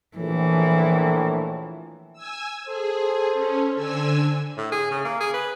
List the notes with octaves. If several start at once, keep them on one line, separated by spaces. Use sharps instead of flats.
A#1 A2 E3
G#5 E6
G#4 A4 C5
C#4
D3 G#5 E6
A2
G#4
C#3
A#3
G#4
B4